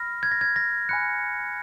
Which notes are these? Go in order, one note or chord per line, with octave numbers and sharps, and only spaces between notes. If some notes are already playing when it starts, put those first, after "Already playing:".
Already playing: B5 F6 A#6
G#6
A#6
G#6
A#6
G#5 B5 F#6 C#7